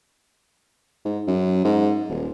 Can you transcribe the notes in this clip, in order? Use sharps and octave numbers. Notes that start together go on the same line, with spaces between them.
G#2
F#2
G#2
D#1